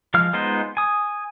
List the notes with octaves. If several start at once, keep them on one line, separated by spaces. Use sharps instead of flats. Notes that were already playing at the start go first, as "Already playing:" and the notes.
F3 G#3 F5 F6
G#3 B3 D#4 F4 C5
G#5 D#6